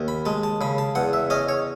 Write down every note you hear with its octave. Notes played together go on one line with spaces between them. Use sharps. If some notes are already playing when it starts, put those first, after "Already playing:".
Already playing: D#2
B5
G#3 A5
A5
C#3 B5
A5
E2 F#5
E5
C#4 D#5
C#5